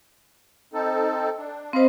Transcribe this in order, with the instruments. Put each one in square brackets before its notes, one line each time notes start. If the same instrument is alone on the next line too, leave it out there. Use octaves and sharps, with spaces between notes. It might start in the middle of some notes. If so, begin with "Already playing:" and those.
[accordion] C4 D#4 A4
D4
[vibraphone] C4 C5 [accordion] D#5 F5 B5